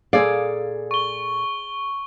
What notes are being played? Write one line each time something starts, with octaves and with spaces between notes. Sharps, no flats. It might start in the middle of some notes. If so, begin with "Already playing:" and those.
A#2 G#4 A4 D5 F5
C#6 G7